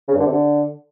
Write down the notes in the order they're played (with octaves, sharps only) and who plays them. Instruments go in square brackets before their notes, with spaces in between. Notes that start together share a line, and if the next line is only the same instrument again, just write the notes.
[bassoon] C#3
G2
D3
C3
D3